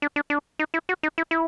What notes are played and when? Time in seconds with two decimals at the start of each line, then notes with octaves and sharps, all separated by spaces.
0.02 D4
0.16 D4
0.30 D4
0.59 D#4
0.74 E4
0.89 F#4
1.03 D#4
1.18 E4
1.31 E4